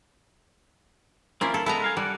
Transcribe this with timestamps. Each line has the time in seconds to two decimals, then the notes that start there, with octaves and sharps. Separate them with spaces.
1.41 A#3 C4 C#4 E4 F4
1.54 A4
1.66 G#3 B3 E4 A4 A5 A#5
1.82 A#4 F5 G#5
1.97 G3 A4 D5 F#5